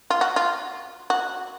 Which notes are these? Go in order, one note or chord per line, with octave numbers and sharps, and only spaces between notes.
F4
F#4
F4
F#4